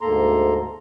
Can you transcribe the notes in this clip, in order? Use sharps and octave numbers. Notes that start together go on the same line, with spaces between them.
D2 G#2 A#3 A4 A#5 C6